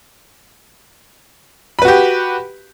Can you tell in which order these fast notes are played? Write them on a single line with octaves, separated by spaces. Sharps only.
B5 B4 F#4 G4